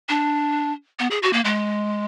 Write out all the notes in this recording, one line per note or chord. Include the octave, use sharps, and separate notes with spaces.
D4
B3
G#4
F#4
A#3
G#3